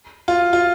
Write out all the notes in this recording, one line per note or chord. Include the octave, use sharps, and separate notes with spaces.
F4
F4